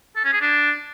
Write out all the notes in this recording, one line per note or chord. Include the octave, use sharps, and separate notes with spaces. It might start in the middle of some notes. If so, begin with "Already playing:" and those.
A4
C#4
G#4
D4